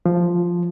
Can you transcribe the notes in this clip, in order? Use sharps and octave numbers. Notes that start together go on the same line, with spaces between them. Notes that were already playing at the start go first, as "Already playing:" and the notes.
F3